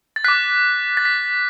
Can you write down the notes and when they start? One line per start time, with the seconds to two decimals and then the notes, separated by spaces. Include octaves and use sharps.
0.16 A6
0.24 D6 F#6 B6
0.97 A6
1.05 B6